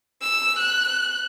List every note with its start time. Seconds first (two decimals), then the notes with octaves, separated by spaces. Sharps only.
0.21 E6
0.59 F#6